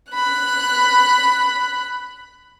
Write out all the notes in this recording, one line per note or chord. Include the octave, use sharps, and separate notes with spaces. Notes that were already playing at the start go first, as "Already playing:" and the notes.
B5 F#6